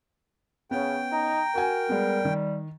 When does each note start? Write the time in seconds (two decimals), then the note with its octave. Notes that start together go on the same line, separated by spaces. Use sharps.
0.71 C#3 B3 C#4 G5
1.12 D#4 A#5
1.55 F#4 A#4 G#5
1.89 G3 G#3 B3
2.25 D#3